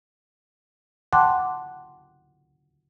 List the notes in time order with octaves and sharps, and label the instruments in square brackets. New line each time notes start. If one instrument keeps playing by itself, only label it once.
[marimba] F#5 G5 A5 C6 D6 F#6